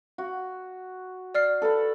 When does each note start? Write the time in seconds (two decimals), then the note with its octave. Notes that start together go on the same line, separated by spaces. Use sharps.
0.18 F#4
1.35 D5 F6 C7
1.62 A4 B4 B5